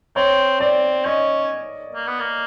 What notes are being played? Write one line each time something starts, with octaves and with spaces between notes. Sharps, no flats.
C4 C#5
C4 D5
C#4 D#5
A#3
B3
A#3